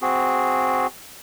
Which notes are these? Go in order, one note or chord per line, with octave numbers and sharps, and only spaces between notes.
C4 F#4 G#4